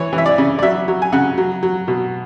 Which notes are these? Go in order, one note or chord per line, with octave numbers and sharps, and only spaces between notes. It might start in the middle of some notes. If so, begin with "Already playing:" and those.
Already playing: E3 C#5
E3
E5
D5
C#3
D5
F#3 E5
F#3
G#5
C#3 F#5
F#3
F#3
B2